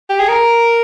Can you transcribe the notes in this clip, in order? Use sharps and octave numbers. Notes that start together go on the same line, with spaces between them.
G4
G#4
A#4